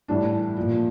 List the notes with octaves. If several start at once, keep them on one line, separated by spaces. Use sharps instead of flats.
A2 E3 G3 D4
A#2 F3